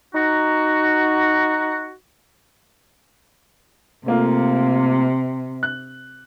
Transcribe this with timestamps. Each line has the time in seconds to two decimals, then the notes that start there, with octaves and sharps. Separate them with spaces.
0.14 D#4 F#4
4.06 C3 A3 A#3 F4
5.63 F#6